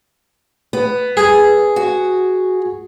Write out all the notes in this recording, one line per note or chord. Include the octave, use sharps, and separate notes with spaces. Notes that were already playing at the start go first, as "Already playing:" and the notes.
B3
G#4
F#4